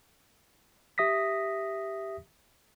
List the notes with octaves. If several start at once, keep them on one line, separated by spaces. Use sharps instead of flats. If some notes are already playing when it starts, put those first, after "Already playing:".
G4 E5 D#6 A#6 B6